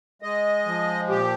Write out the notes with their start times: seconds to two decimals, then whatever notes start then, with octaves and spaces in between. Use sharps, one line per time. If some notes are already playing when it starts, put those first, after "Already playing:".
0.22 G#3 D#5
0.66 F3
1.09 A#2 G4